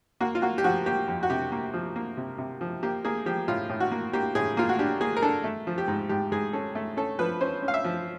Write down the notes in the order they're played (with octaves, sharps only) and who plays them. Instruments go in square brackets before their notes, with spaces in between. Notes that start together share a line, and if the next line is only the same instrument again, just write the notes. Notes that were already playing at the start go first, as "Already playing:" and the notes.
[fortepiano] A#3 F#4
F4
A#3 F#4
G4
F3 F#4
A#3 G4
F2
F#4
C3 G4
A#3
F3
A#3
C3
C3
F3
A#3 G4
A#3 G#4
F3 G4
A2 F4
A2
F#4
A#3
A#3 G4
A2 G#4
A#3 F4
F#4
D4 G4
A#3 G#4
A#4
D4 A4
A3
F3
G4
G#2
G#2 G4
G#2 G#4
C#4 A4
A3
C#4 A4
F3 B4
C#4 C5
C#4
F5
E5
F3